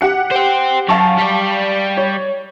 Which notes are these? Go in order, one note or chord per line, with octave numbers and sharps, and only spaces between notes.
G4 F#5 C#7
C5 G5
F#2 F5 A5 C#6
G3 D5
C#5